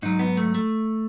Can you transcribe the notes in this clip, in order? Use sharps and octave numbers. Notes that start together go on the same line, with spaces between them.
G#2 F#3 D#4
B3
A3
A3